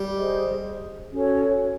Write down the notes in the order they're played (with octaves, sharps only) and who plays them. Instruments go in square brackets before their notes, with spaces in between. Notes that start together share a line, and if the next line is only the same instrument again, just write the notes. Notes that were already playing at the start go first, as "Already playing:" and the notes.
Already playing: [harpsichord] G3
[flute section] G#4 C5 D#5
C#4 F#4 A4 C#5